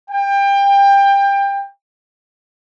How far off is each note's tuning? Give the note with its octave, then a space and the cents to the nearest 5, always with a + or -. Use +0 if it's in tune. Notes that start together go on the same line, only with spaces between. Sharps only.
G5 +25